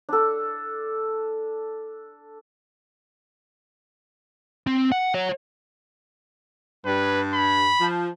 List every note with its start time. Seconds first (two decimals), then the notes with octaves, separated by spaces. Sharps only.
0.09 D4 A4
4.67 C4
4.92 F#5
5.14 C#5 F#5
6.85 G2 B4
7.34 B5
7.81 F3